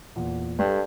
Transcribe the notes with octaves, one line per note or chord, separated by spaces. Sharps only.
E2 A#2
G2 G3 G4 A4